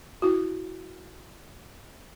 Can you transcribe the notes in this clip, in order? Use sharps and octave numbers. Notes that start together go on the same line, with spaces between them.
E4 F#4